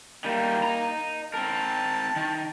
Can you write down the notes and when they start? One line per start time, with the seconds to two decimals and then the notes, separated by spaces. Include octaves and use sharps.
0.24 D#3 G3 A#3
0.63 D#5 A#5
1.34 C4 A#4 A5
2.16 D#3